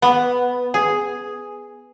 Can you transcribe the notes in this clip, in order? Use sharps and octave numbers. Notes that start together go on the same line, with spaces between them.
B3
G#4